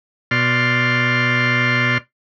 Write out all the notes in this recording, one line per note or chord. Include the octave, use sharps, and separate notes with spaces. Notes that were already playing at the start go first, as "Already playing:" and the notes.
B2 D5 C6 F6